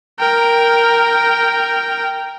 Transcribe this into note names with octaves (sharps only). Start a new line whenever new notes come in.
A#4 G5